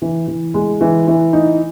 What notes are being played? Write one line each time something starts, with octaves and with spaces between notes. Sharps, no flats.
E3
E3
G#3
E3
E3
D#4